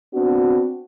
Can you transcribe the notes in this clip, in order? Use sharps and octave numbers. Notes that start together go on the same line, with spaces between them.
B3 C4 D4 F#4